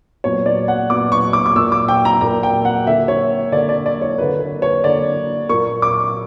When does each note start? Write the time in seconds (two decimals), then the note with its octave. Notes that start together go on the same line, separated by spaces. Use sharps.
0.24 A#2 F#3 B3 C#5
0.46 D5
0.68 F#5
0.90 A#2 F#3 B3 D6
1.12 C#6
1.33 D6
1.46 D6
1.55 A#2 A#3 E6
1.72 D6
1.88 G5
2.05 A#5
2.21 A#2 A#3 A#5
2.43 G5
2.65 F#5
2.87 D3 A#3 E5
3.08 C#5
3.52 D3 A#3 D5
3.69 D5
3.86 D5
4.02 C#5
4.18 D3 A#3 B4
4.40 B4
4.62 C#5
4.84 D3 A#3 D5
5.49 A#2 A#3 C#6
5.82 D6